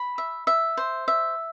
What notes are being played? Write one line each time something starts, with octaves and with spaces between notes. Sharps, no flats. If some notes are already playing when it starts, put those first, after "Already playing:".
Already playing: B5
E5
E5
C5
E5